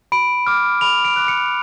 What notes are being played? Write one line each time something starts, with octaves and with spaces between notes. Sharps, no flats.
B5 D7
D6 F6
B5 F7
D7
D6 F#6
C#7